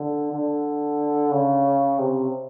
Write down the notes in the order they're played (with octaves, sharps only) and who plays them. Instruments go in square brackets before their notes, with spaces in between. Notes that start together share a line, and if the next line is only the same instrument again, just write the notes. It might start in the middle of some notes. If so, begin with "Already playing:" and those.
Already playing: [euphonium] D3
D3
C#3
C3